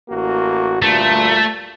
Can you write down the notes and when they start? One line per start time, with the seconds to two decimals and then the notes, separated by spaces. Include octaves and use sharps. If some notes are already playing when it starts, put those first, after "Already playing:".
0.10 A1 A#3 F#4
0.82 D2 G2 A#2 A3